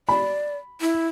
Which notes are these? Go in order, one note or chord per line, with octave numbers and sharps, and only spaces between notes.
D5 B5
E4